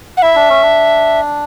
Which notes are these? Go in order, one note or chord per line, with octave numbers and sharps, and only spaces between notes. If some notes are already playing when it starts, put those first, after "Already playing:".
F#5
E4 E5
D4
C#4
D4